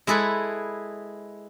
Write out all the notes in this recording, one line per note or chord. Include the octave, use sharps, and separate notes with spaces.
G#3 E4 G#4 A4 B4